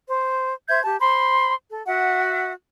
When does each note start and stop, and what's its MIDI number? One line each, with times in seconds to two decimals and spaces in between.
0.07 0.52 72
0.68 0.81 72
0.68 0.81 76
0.68 0.81 91
0.68 0.81 92
0.83 0.98 67
0.83 0.98 81
1.00 1.54 72
1.00 1.54 83
1.00 1.54 84
1.71 1.85 69
1.85 2.51 66
1.85 2.51 76
1.85 2.51 78